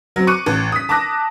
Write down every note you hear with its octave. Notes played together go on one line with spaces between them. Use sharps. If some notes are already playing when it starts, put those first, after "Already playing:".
F#3 C4
C#6 D6 F#6 C#7 D#7
A1
D#6 B6
A5 D6 D#6 F#6 A#6